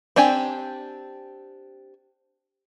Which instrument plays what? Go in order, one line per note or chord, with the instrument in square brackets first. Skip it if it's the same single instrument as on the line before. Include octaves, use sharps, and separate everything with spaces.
[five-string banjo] C4 D4 G4 G#5